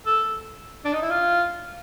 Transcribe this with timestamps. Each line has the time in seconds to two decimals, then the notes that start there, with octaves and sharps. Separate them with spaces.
0.06 A4
0.85 D4
0.93 D#4
1.02 E4
1.11 F4